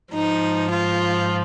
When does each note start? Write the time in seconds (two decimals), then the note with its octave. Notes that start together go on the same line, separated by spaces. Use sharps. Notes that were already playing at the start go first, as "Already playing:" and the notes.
0.14 G#2 F3 D#4
0.72 F4